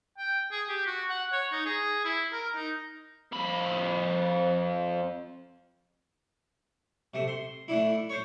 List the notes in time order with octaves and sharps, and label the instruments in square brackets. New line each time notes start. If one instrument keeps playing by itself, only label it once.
[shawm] G5
G#4
G4
F#4
F#5
C#5
D#4
G#4
E4
A#4
D#4
[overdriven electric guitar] F2 B5
[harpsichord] C3 A3
C6
A3 D4 E4
C5 C#5